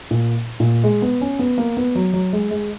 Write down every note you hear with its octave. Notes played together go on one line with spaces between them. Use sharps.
A#2
A#2
G#3
B3
C#4
B3
A#3
B3
F#3
F#3
G#3
G#3